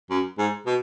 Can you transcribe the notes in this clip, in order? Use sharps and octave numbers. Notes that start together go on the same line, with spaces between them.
F#2
G#2
B2